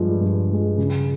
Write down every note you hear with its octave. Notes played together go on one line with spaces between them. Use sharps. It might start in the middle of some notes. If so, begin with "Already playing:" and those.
Already playing: G2 F3 G#3
G2
F3 G#3
C#3